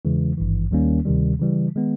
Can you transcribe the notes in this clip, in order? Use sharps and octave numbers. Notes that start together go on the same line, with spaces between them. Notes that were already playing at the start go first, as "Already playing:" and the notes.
E2 C#3 E3 G#3
G#1 G2 E3
D#2 D#3 G3 A#3 C#4
D2 C3 D#3 G3
C#3 E3 G3
D#3 G#3 B3